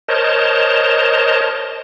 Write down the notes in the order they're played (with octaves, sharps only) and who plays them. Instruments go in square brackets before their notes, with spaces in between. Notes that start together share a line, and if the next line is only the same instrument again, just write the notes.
[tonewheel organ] A#4 C5 C#5 D#5 A5